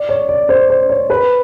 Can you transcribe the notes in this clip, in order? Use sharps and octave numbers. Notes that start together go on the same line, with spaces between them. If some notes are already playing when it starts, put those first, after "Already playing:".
Already playing: D5
C#5
D5
C5
C5
C#5
B4